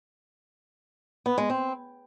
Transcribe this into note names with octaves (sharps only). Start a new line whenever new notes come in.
B3
G#3
C4